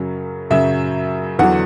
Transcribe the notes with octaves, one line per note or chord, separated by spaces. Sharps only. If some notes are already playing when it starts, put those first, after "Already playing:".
Already playing: F#2 C#3 F#3
F#2 C#3 F#3 E5
E2 D3 F#3 F#5